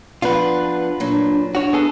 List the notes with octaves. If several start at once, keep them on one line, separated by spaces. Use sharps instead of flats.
F3 B3 D4 F4 B4
A#2 F#3 D4
D4 E4 F#4 C#5
B3 G#4 A4